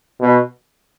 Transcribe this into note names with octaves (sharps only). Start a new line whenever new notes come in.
B2